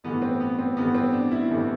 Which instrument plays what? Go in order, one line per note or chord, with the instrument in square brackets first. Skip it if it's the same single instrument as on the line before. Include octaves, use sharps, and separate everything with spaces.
[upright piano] A1 G2 E3 A3 B3
C4
B3
C4
A1 G2 E3 A3 B3
C4
D4
E4
A1 G2 E3 A3 E4